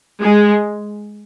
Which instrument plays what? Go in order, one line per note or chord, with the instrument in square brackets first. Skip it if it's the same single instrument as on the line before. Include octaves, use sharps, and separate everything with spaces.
[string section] G#3